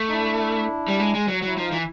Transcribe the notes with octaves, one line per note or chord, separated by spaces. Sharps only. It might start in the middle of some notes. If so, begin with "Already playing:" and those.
Already playing: A3
D#4
D4 E4
G3
G#3
G#3
F#3
F#3 E4
F3 D#4 F4
E3